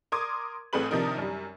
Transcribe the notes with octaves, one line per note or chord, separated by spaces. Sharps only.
A#4 C6 D6 D#6 G#6
A1 A3 C4 G#4 B4 F#7
C3 D#3 F3 D4 D#4 A#4
F#2 G3